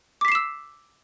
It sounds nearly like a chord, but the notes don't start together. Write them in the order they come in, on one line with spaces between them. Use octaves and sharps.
D6 B6 C7 E7 E6